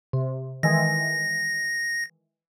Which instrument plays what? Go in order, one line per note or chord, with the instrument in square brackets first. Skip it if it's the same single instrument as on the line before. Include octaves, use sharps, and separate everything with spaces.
[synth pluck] C3
[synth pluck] D#3 E3 G#3 [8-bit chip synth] A#6